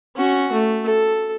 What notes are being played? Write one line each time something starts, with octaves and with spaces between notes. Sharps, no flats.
C#4 F#4
A3
A4